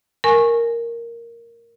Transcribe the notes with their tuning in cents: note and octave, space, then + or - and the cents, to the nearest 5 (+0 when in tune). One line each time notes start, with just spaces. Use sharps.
A#4 +0 G#5 +0 C#6 -15